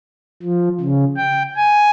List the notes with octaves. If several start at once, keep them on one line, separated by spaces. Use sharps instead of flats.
F3
C#3
G5
G#5